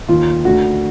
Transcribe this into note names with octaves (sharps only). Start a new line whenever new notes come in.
D#2 D#3 F4
D2 D3 F#4